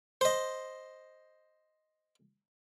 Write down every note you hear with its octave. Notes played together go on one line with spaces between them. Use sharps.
C5 D#5